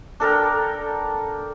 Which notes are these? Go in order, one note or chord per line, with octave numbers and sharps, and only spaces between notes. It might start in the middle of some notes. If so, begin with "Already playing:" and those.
D4 A4 A#4 G5